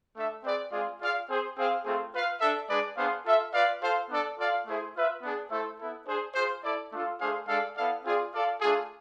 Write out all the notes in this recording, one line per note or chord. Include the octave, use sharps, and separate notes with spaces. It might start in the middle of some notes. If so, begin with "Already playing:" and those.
A3 D4 A4 E5
C4 G#4 B4 D5
G#3 C4 F4 G#4 D5
F4 G#4 D5 F5
C4 G#4 C5
C4 G#4 C5 F5
A3 C4 F4 G#4
F4 B4 F5
D4 A4 E5
G#3 D4 G#4 B4 D5
B3 D4 G#4 C5 F5
F4 A4 E5
F4 B4 D5 F5
F4 A4 C5 F5
B3 D4 A4 D5
F4 A4 D5 F5
A3 E4 G#4 C5
F4 B4 E5
B3 D4 G#4
A3 E4 A4 C5 E5
B3 E4 A4
D4 G#4 C5
F4 G#4 C5
E4 A4 D5
A3 D4 F4 A4
A3 D4 G#4 C5 F5
G#3 D4 A4 D5 F5
B3 E4 A4 D5 F5
C4 F4 G#4 D5
F4 A4 D5 F5
A3 D4 F4 G#4